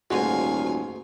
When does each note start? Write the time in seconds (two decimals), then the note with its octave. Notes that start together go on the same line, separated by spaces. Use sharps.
0.11 D#1 D2 G#2 F#4 F5 G#5